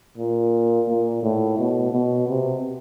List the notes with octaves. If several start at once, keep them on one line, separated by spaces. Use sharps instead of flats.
A#2
A#2
A2
B2
B2
C3